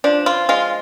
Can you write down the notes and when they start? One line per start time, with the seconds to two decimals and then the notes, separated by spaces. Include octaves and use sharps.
0.04 F3 D4
0.26 F4
0.49 G#3 F4